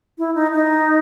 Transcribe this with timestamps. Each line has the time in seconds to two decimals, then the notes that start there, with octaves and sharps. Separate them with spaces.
0.18 E4
0.35 D#4
0.53 D#4